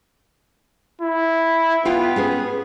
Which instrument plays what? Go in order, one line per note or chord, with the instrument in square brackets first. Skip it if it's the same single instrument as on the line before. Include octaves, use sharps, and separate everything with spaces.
[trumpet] E4
[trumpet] B3 [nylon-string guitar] F4 F5 G5
[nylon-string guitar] C#4 G#4 B4